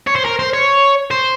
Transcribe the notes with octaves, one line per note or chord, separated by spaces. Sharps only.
C#5
C5
A#4
C5
C#5
C5